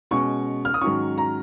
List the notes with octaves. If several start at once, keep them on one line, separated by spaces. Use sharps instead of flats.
B2 G#3 C#4 C#6
F6
D#6
G#2 D#3 F#3 C#4 C#6
A#5